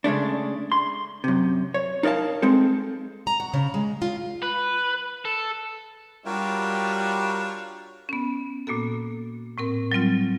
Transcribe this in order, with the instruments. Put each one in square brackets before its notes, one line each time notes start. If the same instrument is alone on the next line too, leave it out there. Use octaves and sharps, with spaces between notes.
[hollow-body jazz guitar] C#3 G#3 A3 D4
C6
F#2 C3
C#5
D#4 A#4 D5 F5 A5
G#3 C4 A4
[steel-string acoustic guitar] A#5
F#4
C#3
G#3
F4
[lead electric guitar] B4
A4
[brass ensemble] G3 [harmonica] D4 F4 C#5 [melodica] F#4 A#4 G5
[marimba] B3 C#4
A#2 A#3 B3 F#4 A4
A2 C4 A#4
F#3 G3 C4 F4